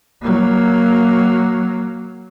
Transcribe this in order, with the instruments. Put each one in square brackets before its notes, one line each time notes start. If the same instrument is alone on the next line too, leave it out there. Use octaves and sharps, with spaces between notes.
[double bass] F#3 A#3